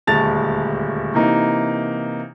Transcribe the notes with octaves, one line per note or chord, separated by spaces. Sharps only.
D#1 D2 G#3 A5 A6 F7
C3 E3 A#3 D#4